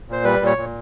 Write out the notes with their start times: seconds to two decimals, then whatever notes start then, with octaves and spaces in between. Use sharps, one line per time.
0.08 A#2 C5
0.24 G3 B4
0.41 A#2 C#5
0.57 A#2